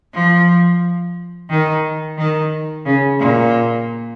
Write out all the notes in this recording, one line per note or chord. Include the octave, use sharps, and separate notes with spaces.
F3
D#3
D#3
C#3
A#2